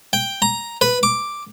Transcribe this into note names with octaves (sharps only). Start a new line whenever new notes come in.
G5
A#5
B4
D6